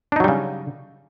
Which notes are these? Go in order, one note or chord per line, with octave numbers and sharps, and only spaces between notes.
C#3 F#3 G3 D4 D#4